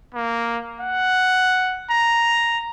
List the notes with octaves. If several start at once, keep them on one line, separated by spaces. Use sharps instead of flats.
A#3
F#5
A#5